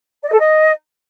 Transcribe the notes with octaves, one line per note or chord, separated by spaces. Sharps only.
D5
D#5
A4
D#5